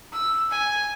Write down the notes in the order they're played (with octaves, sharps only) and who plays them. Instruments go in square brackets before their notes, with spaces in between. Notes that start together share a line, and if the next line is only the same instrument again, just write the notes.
[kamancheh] E6
G#5